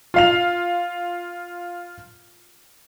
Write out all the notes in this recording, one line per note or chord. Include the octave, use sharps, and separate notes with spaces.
F4 F5 F7